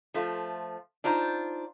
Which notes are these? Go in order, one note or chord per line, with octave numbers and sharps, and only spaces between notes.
F3 A3 F4
D4 D#4 F4 C5